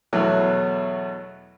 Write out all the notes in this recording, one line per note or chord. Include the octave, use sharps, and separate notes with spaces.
E2 B2 E3 F#3 A3